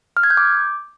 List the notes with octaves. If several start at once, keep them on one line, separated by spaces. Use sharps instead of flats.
F6
G#6
G6
D6